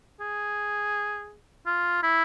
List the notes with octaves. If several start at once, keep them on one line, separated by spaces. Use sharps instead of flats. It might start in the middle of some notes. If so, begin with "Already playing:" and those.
G#4
F4
E4